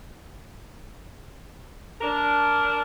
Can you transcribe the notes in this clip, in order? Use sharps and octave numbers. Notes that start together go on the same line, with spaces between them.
D4 A#4